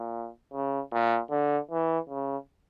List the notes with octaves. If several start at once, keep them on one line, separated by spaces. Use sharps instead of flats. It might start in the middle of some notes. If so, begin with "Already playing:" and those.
Already playing: A#2
C#3
A#2
D3
E3
C#3